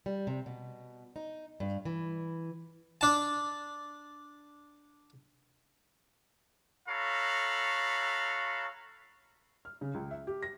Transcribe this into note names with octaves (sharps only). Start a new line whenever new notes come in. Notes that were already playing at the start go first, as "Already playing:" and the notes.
G3
C3
B2
D#4
G2
E3
D4 A5
F#4 A4 C#5 F5 A#5 B5
F6
C#3
C#2
E5
G4
A#6